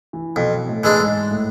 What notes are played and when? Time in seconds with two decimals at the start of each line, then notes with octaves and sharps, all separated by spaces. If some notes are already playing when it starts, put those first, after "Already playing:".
0.13 E3
0.36 F2 B2
0.68 A2
0.84 E3 G#3 D4
1.00 G#2
1.31 A2